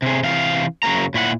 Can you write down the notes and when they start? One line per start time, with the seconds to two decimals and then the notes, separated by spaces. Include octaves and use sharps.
0.02 C3 G#4
0.23 C3 E3 F5
0.83 F#2 C#3 F#3 A#3 A#5
1.14 A#2 E4 C5 F#5